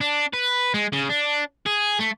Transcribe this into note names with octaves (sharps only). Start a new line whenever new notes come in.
D4
B4
G#3
C#3
D4
G#4
A3